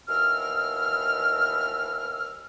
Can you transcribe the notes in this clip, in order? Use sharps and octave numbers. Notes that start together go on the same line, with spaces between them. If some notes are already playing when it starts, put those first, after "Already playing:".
D#2 B2 E3 E6 F6